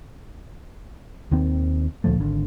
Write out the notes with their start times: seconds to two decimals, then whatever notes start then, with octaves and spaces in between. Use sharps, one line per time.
1.31 D#2 D#3 C4
2.04 D2 A#2 F3 A3
2.20 G#1 D3